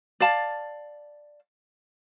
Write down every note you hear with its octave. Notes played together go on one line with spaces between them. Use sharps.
D5 F5 A5